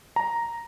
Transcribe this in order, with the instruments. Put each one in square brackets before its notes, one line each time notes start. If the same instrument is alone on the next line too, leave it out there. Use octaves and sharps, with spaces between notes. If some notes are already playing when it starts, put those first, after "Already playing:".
[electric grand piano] A#5